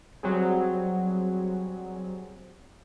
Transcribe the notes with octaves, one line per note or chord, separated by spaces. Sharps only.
F#3 G3 C4 G#4